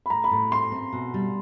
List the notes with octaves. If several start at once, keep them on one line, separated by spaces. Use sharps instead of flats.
B5
A2 A#5
B5
A2
C4 C6
C4
B2
G3